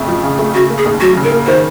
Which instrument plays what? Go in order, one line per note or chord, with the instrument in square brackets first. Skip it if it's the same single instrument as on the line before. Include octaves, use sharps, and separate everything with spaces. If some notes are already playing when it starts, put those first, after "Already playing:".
Already playing: [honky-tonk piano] F2 C#3 A3
F3
C#3
A3
[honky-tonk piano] C#3 [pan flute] F#4
[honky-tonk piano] A#3
[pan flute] G#4
[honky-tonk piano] D#2
[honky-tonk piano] F#3 [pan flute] F#4
[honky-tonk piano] C#3
[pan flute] A#4
[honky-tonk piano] A#3
[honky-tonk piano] D#3 [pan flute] C5